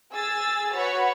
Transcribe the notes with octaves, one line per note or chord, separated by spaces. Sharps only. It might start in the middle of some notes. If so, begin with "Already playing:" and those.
G#4 G#5 E6 A6
F#4 B4 C#5 F#5 B5